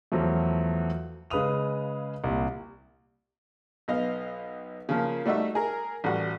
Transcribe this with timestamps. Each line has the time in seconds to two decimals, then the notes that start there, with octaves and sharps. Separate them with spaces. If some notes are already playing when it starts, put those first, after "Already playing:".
0.12 E2 F3 F#3 A3
1.30 C#3 G#3 B4 F5 D#6 F7
2.24 C2 A#2
3.88 B1 B3 D#5 F5
4.89 C#3 F3 A#3
5.26 G3 A3 D#4 F#4 E5
5.55 G#4 A#4
6.04 A1 G3 F#4